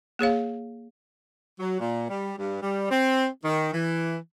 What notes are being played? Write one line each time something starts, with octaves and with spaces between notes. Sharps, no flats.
A#3 G#4 C#5 F5
F#3
A#2
G3
G2
G3
C4
D#3
E3